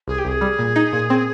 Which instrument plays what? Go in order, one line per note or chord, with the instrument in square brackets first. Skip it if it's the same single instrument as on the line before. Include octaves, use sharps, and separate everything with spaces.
[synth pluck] C2 [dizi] G#4
[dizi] G4
[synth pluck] C2 [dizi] G#4
[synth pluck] G3
A#2
D#4
A#2
C4